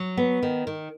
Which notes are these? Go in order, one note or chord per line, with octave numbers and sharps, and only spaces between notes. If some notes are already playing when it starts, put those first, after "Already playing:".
Already playing: F#3
B3
D#3
D#3